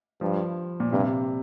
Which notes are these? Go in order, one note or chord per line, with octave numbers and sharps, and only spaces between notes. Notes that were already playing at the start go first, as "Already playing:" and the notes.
G2 F3
A#2
G2 C3